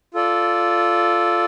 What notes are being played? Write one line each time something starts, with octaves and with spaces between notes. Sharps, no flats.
F4 A4 D5